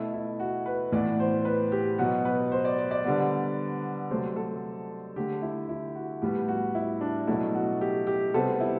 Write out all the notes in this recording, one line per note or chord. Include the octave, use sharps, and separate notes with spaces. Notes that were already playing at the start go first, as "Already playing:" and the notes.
Already playing: B2 A3 E4
E4
F#4
B4
A2 E3 B3 D5
C5
B4
G4
B2 F#3 B3 F#4
B4
C5
D5
D5
D5
D3 G3 B3
C3 F#3 A3 C5
A4
D3 A3 G4
E4
E4
F#4
A2 G3 B3 G4
F#4
E4
D4
B2 F#3 A3 E4
F#4
G4
G4
C3 G3 B3 A4
E4